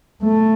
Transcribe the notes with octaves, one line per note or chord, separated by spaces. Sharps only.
A3